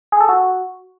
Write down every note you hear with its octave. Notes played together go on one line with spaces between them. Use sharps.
G#4
A4
F#4